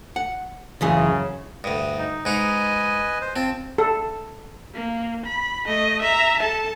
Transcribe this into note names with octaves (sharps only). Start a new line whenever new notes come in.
F#5
C#2 F#2 C#3 E3 G#4
D2 G2 D#6
D#4
G#2 D#4 B4 D#5 G#5
C5
C4 F4 A5
A4
A#3
B5
A3 D#5
E5 A#5
A4 A5